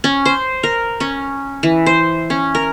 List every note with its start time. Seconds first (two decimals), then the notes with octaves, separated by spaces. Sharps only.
0.04 C#4
0.26 C5
0.63 A#4
1.00 C#4
1.63 E3
1.86 C5
2.30 C#4
2.55 A#4